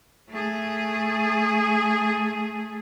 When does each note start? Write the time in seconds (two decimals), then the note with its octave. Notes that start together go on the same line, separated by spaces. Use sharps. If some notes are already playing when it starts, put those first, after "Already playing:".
0.29 A3 G#4